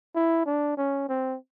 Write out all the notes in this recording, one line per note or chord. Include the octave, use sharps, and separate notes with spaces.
E4
D4
C#4
C4